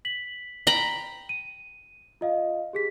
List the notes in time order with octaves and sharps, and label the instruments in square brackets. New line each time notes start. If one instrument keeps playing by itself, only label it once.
[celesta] B6 F#7
[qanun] G5 A#5 B5
[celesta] D#7
F4 D#5 F5
G4 G#4 B6